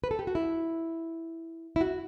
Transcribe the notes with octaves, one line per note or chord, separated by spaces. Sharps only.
B4
A4
G4
F#4
E4
E4
F#4